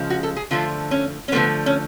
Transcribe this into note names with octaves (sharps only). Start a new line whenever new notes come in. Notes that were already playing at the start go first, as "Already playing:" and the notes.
Already playing: C#3 F3 G#3
F#4
A4
G#4
D3 F3 A3 F4
C#4
C#4
D3 F3 A3 B3
C#4